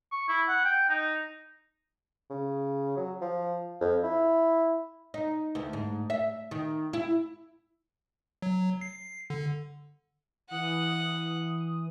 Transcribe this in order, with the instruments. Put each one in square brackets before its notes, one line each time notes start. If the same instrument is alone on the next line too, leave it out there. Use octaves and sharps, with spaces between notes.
[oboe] C#6
E4
F#5
G5
D#4
[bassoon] C#3
F#3
F3
F2
E4
[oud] D#4
D2
G#2
E5
D#3
E4
[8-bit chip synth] F#3
C7
D3
[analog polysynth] E3 D#6 [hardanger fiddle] F#5